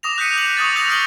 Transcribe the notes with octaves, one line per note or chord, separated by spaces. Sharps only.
D6 D#6 A#6 F7
F#6 G6 B6 C#7 D#7
C#7 F#7
C#6 D#6 F#6 A6
D#6 E6 G6 A#6 F#7
F6 C7 D7 F#7